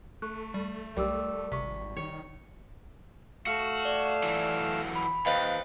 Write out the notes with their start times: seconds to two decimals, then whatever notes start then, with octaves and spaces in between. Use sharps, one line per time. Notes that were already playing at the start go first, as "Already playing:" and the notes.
0.22 A3 C#6 F#6
0.54 G3
0.97 B1 G3 A#4 D6 E6
1.52 G#1 C3 C#6 B6
1.97 D#3 C#5
3.46 A3 F#4 F5 E6
3.85 D5
4.23 E3 F#3
4.95 B5
5.26 D#2 B4 C5 D#5 F5 G5